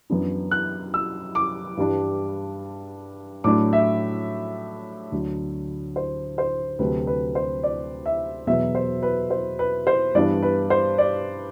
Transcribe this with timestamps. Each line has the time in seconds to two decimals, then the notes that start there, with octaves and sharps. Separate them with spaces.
0.10 F#2 E3 B3 D4
0.51 F#6
0.94 E6
1.35 D6
1.77 G2 E3 G3 D4
3.44 A2 F#3 A3 D4 D6
3.73 E5
5.12 D2 D3 F#3
5.96 C5
6.38 C5
6.79 D2 C3 F#3 A3 B4
7.07 B4
7.35 C5
7.64 D5
8.06 E5
8.47 E2 B2 F#3 B3 E5
8.75 C5
9.03 B4
9.30 C5
9.59 B4
9.87 C5
10.15 G2 E3 B3 D4 D5
10.43 B4
10.70 C5
10.98 D5